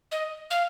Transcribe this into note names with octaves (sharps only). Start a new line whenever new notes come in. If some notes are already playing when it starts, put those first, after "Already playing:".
D#5
F5